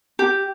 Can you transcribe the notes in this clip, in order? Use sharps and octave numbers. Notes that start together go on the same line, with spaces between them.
G4